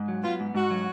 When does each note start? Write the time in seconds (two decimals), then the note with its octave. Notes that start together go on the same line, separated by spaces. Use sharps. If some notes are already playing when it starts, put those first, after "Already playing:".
Already playing: G#2
0.08 F#3
0.24 B3 F4
0.40 G#2
0.55 G#2 F#4
0.70 F#3